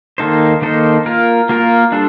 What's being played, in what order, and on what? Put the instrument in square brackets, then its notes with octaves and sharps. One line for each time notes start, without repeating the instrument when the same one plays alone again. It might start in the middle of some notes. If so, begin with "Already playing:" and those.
[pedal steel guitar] D#3 A#3 D#4 A4 C5
D#3 A#3 D#4 A4 C5
A#3 F4 A#4
A#3 F4 A#4
G3 D4 A4 C5